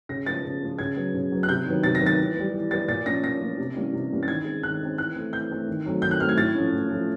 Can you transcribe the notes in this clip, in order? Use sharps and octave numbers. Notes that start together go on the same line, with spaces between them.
C#3 A#6
F3 G#3 B3 A6
C#3
F3 G#3 B3
C#3 G#6
F#3 B3
C#3
F#3 B3
F#6
C3 G6
D#3 F#3 B3
C3 A6
A#6
D#3 F#3 B3
A6
E3
G3 B3
E3
G3 B3 A6
A#2 A6
F3 A#3 C#4 A#6
A#2 A#6
F3 A#3 C#4
C3
E3 G3 A#3 C#4
C3
E3 G3 A#3 C#4
A6
D#3 G#6
G#3 C4
D#3 F#6
G#3 C4
E3 F#6
A3 C4
E3 G6
A3 C4
D#3
F#3 A3 C4
D#3 G6
F#6
F#3 A3 C4 F6
G#6
A2 A6
F3 A3 C#4
A2
F3 A3 C#4